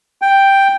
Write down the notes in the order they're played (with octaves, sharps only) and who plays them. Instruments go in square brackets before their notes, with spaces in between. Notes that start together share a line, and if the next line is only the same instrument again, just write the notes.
[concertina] G5